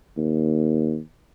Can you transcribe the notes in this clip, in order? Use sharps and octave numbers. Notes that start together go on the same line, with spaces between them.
D#2